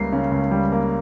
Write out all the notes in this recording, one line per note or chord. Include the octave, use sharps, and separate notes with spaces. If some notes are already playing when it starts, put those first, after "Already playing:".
Already playing: C#2 C#3 G3 A#3 C7
C#3
C#2
G3
A#3